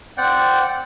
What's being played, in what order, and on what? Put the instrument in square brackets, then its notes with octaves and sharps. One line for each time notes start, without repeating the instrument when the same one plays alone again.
[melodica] C4 D5 F#5 G5